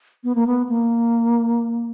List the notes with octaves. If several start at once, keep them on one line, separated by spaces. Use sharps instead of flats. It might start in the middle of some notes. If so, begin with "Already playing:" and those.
B3
A#3
B3
A#3